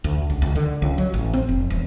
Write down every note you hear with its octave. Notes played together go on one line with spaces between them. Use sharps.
D2
C#2
C#2
D3
C#2
F#3
A1
C4
F1
E1